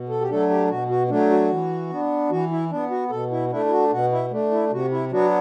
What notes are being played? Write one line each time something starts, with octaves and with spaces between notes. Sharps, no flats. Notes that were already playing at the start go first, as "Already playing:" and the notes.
Already playing: B2
A4
G4
F#3 A3 D4 A4
G4
B2 F#4
F#4
F#3 A3 D4
F#4
E3
B3 D4
E3 F#4
E4
B3 D4
F#4
B2 A4
E4
A3 D4 E4
E4
F#4
B2 F#4
E4
A3 D4
E4
C3 F#4
E4
F#3 B3 D4 F#4